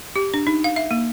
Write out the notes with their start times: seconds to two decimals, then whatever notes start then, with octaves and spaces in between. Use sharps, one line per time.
0.16 G4
0.34 D4
0.47 D#4
0.64 F5
0.76 E5
0.91 A#3